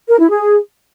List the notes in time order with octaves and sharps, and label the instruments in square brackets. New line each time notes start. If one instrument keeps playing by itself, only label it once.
[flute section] A#4
E4
G#4